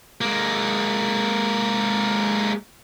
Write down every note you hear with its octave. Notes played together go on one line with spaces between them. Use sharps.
G#3 A#3